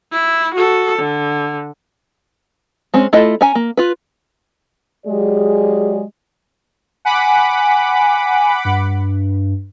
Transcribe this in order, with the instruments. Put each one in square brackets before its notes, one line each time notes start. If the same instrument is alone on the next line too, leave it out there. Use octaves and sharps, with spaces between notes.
[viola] E4
F#4 A4
D3
[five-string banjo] G#3 C4 C#4
A3 E4 F4 A4 D#5
C#4 G#5 A#5
A#3
F4 B4
[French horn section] F#3 G#3 G4 G#4 D5
[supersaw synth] F#5 B5 D6 [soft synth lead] G#5
[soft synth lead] G2